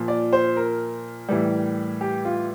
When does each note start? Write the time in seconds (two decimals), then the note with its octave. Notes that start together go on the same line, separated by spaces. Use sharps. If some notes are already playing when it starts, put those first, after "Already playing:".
Already playing: A#2 F3
0.08 D5
0.33 C5
0.57 A#4
1.29 A2 E3 G3
2.01 G4
2.25 F4